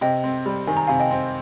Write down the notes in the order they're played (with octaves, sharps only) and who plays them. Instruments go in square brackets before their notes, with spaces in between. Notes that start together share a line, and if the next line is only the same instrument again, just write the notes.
[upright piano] C3 [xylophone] D#5 G5
[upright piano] C4
G3
[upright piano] D#3 [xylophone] G#5
[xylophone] A#5
[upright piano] C3 [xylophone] F5 G#5
[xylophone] D#5 G5
[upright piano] C4